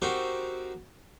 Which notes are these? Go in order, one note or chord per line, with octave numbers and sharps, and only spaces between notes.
C4 D#4 F#4 G4 A#4